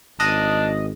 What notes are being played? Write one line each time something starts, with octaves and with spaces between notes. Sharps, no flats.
G#1 D4 D#5